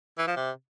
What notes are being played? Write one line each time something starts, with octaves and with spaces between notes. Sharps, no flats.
E3
F3
C3